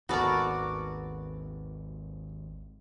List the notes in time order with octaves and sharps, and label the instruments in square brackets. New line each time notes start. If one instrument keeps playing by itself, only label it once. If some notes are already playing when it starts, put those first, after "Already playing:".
[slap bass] G#1 D#2 [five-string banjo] B3 A4 A#4 [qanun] F#4 D5